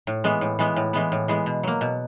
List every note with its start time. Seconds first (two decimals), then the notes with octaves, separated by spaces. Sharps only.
0.07 A2
0.24 E3 G#3 B3
0.41 A2
0.59 E3 G#3 B3
0.76 A2
0.93 E3 G#3 B3
1.12 A2
1.28 E3 G#3 B3
1.46 B2
1.63 F#3 A#3
1.81 B2